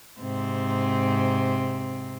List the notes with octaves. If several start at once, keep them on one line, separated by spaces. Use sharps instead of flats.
G#2 C3 C4